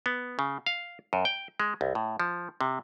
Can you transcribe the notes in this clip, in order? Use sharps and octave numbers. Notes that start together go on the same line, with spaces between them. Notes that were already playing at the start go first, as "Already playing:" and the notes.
B3
C#3
F5
F#2
G5
G#3
C2
A2
F3
C3